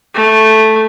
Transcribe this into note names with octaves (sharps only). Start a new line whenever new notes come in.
A3